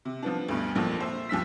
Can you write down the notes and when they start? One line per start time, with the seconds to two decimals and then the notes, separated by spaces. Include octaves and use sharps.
0.05 C3
0.23 F3 B3 D4
0.49 D2 G2 B2
0.75 A#1 F2 A#2 F3
1.00 C5 E5
1.29 D#2 F3 E6 B6